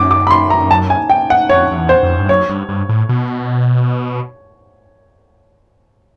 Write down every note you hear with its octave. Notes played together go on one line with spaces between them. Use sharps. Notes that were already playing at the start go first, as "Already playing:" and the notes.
Already playing: F#2 D6
D6
B5
C6
A#5
A5
G#5
G5
F#5
F2 C#5
F2
E2
C5
F2
G2
F#2 C#5
G2
G2
A2
B2